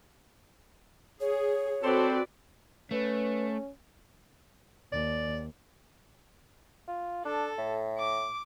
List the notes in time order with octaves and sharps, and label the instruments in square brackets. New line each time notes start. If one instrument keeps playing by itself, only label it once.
[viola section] G#4 [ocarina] C#5
[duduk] C4 [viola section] F#4 B4 D5 [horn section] A4 C5
[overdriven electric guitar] A3 [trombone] C#4 [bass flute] B4
[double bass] D#2 [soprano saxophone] D5
[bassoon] F4
[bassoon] D4 [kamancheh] A4
[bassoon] A2
[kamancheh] D6